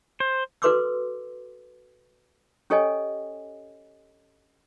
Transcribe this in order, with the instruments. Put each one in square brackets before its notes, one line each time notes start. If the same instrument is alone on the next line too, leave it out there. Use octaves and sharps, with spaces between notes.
[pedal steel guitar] C5
[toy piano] F#4 A4 B4 C6 D6 E6
C#4 G4 A4 C#5 D#5 G#5